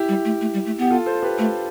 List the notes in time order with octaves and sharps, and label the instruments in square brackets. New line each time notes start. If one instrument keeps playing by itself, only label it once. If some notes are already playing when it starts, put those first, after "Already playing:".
Already playing: [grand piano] E4 G4
[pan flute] G3
A3
A3
G3
A3
[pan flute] B3 [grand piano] G4
[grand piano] F4 A4
A4 C5
G4 B4
[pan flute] A3 [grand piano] F4 A4